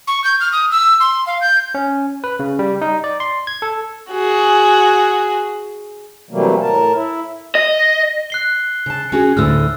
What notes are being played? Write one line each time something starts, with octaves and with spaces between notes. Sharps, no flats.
C#6
G6
F6
D#6
E6
C6
F5
G6
C#4
B4
C#3
G3
D#4
D5
C6
G#6
A4
F#4 G#4
C3 E3 F#3 G3 A3 A#3
A2 A#4 A5
E4
D#5
F#6 C7 G7
C#3 A5
C#4 F#4 G#4
D2 A2 D3 E6 F6